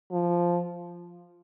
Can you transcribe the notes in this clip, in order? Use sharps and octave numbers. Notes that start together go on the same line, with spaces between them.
F3